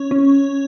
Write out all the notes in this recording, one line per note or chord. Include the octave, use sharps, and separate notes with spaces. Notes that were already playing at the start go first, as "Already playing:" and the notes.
Already playing: C#4
C#4